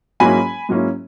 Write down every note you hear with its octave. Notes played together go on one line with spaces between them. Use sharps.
G#2 F#3 A#3 C#4 E4 G#5 B5
G#2 F#3 A#3 C#4 E4